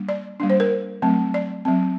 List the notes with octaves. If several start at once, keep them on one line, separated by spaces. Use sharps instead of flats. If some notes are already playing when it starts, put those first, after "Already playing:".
Already playing: G3 A#3 D4
D5
G3 A#3 D4
C5
A#4
F#3 A3 C4
D5
F#3 C4